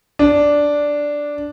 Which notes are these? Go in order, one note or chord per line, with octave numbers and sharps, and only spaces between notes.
D4